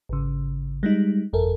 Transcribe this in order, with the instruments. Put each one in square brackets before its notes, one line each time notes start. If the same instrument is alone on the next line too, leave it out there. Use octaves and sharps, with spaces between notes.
[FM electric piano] G#1 C#3
G3 G#3 D#4
G1 F2 A4 A#4